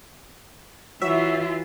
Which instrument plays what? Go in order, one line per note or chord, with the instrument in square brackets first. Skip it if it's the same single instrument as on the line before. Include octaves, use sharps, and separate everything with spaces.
[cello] E3 F4 [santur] F#3 [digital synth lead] E5